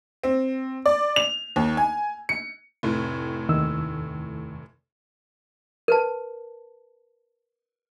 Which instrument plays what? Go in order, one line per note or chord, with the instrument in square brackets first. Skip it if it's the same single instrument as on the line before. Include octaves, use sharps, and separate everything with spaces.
[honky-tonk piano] C4
D5
F7
D#2
G#5
C#7
F1 A2
[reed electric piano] D#2 D#3 E6
[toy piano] A#4 B4 A5